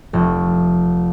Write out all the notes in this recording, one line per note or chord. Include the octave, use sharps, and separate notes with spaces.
F1